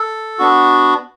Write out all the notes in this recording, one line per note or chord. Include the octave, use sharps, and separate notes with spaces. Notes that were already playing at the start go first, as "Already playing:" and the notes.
Already playing: A4
B3 D4 F#4